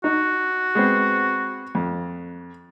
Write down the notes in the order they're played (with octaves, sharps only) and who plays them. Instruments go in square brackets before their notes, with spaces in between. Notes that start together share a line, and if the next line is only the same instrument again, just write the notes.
[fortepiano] D#4 [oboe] F#4
[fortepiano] G#3 B3 C4
F2